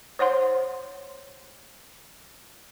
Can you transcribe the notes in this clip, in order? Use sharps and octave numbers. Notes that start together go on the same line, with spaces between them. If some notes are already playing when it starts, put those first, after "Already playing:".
C5 C#5 F#5 C6